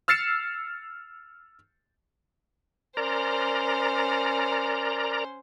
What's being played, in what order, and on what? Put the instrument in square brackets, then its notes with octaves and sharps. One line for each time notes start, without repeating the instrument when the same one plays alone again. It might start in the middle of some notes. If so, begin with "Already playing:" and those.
[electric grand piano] E6 F6 A6 C7 C#7 E7
[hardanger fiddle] C#4 C5 [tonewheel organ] A#4 D5 A#5